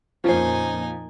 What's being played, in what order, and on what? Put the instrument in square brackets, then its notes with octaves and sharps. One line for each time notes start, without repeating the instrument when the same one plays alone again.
[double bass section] F2 A#2 A#3 [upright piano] F3 [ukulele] C#4 C5 [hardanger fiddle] D#4 G#5